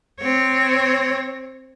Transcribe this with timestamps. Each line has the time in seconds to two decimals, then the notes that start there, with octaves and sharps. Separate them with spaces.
0.20 C4 C#5